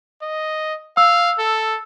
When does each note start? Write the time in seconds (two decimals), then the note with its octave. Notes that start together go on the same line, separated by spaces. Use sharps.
0.22 D#5
0.97 F5 E6
1.38 A4